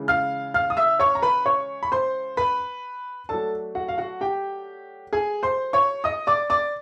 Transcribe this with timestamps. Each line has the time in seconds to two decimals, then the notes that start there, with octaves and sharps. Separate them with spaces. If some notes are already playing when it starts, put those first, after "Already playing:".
Already playing: C#3 E3 G#3
0.08 F5 F6
0.54 F5 F6
0.70 D#6
0.77 E5 E6
1.00 C#5 C#6
1.15 A#5
1.22 B4 B5
1.46 C#5 C#6
1.83 B5
1.92 C5 C6
2.37 B4 B5
3.29 F#3 A3 D4 A4 A5
3.75 F#4 F#5
3.88 F5
3.98 F#4 F#5
4.21 G4 G5
5.13 G#4 G#5
5.43 C5 C6
5.73 C#5 C#6
6.04 D#5 D#6
6.27 D5 D6
6.50 D5 D6